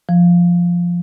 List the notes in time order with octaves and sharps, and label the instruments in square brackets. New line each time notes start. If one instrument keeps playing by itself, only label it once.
[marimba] F3